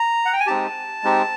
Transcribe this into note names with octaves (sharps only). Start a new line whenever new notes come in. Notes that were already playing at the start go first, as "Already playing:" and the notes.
Already playing: A#5
F#5
G5
G#5
G#3 C4 D#4 G4 A5
G#3 C4 D#4 G4